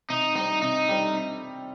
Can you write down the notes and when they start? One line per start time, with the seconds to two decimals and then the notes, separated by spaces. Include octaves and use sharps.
0.09 C3 D#4
0.36 G3 C4 D#4
0.61 C3 D#4
0.89 G3 C4